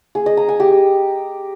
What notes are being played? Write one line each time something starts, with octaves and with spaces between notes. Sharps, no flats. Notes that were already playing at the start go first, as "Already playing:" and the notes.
G#4
D#5
A#5
G#5
G4